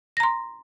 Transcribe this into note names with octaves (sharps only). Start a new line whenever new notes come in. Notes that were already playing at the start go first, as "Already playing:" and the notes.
A#5 C6 A#6